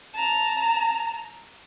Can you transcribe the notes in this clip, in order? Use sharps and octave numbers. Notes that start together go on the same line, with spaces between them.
A5 A#5